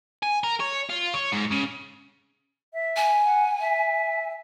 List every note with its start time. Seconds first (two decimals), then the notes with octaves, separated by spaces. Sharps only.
0.23 G#5
0.44 A#4
0.60 C#5
0.89 F4
1.14 C#5
1.32 G#2
1.52 C#3
2.74 E5
2.96 G#5
3.25 F#5
3.60 E5